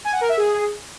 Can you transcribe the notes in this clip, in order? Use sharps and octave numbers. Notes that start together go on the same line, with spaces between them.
G#5
F#5
A#4
E5
G#4